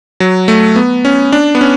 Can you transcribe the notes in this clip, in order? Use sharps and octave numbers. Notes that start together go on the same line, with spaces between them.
F#3
A3
B3
C#4
D4
B3
C#4